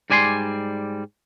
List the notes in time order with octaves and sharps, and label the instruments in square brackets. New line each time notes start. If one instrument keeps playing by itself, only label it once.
[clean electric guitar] G#2 G3 D5 G#5 B5 C6